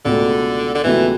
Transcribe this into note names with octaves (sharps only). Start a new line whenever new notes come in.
C#2 B2 D3 A3
D3
C#2 B2 E3 A3